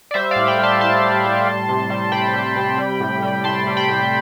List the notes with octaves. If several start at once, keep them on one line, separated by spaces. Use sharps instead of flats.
D5
G3 C5 E5
A2 D5 F5
G5 B5
G3 A5 C6
A2 A5 C6
G3
A2
G3
C3
G3
C3 G5 B5
G3
C3
G3
A2
G3
A2 A5 C6
G3
G5 B5
A2